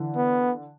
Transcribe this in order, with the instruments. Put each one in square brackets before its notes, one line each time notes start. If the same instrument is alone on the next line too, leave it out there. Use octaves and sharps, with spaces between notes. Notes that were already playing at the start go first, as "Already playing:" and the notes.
Already playing: [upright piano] D3 E3
[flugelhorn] B3